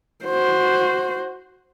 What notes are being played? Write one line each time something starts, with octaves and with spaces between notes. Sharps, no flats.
F#4 C5